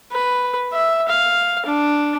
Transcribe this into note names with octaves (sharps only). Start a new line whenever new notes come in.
B4
E5
F5
D4